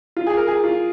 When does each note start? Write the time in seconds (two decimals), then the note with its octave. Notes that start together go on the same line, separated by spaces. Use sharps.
0.17 F4
0.27 G#4
0.37 A#4
0.48 G#4
0.64 F4